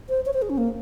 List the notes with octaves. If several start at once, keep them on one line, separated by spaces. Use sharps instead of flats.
C5
C#5
C5
G#4
C#4
A#3